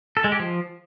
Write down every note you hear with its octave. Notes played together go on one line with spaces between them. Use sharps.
A4
G#3
G4
F3